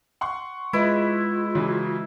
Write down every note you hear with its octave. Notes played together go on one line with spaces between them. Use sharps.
F#5 C6 C#6
G#3 E4 F4 B4 D#5
C#3 E3 F#3